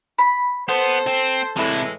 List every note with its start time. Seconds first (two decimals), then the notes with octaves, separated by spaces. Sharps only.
0.19 B5
0.68 B3 A4 C5
1.07 C4
1.57 A2 C3 E3 G#3 E4